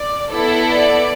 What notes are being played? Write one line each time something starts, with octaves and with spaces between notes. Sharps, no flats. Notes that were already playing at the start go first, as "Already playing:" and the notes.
Already playing: D5
B3 E4 A4
D5